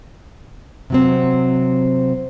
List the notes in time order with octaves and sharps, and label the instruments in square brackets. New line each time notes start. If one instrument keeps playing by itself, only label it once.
[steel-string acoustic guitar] C3 F#3 C4